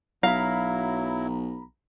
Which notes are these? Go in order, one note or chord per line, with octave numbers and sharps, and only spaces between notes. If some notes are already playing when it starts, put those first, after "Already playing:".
B1 F#3 E4 F5 A#5 B5